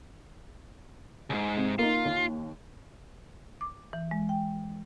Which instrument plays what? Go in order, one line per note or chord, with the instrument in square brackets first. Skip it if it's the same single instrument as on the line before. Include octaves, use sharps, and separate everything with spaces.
[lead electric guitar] C#2 G#2
[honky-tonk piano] C3
[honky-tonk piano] A#3 D#4 [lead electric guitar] F4
[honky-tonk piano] D#2
[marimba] D6
E3
G#3
G5